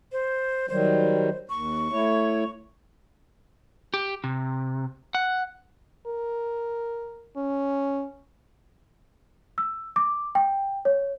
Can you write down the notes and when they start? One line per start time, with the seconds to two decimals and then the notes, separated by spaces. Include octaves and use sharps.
0.12 C5
0.69 D#3 F#3 G3 C5
1.50 D#2 C#6
1.92 A3 E4 C#5
3.94 G4
4.24 C3
5.15 F#5
6.06 A#4
7.37 C#4
9.58 E6
9.96 D6
10.35 G5
10.85 C#5